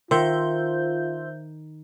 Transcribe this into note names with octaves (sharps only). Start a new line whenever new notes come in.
D#3 F4 C5 E5 G6